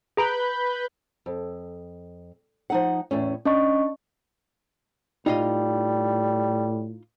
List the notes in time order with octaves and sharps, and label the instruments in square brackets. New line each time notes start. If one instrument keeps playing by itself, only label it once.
[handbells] G#4 A#5 D7 [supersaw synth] B4 B5 G6
[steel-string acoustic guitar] F2
F3 D#4 F#5
E2 A2 C#4
[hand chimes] C#4 D#5 C#6 [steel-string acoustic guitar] D4
[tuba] A2 [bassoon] G3 [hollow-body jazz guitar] D#4 F4 D#5